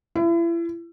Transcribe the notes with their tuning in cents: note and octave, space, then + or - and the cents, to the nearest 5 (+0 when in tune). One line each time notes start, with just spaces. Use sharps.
E4 +35